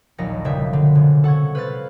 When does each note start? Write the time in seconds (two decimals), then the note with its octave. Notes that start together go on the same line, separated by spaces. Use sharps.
0.18 A#1 D#2 F#3 A#6 C#7
0.45 F#1 B2 G3 E5
0.73 D3
0.95 F1
1.24 A4 F#5 C#6 G#6
1.55 B4 C5 F5 F6 F#6 A6